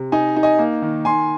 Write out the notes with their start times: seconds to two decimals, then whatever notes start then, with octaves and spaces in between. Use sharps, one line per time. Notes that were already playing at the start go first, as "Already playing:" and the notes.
Already playing: C3
0.12 D#4 D#5 G#5
0.37 D#4
0.43 D#5 G#5
0.59 A#3
0.82 D#3
1.05 D#3 G#5 C6